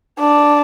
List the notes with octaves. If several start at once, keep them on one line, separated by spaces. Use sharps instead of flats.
D4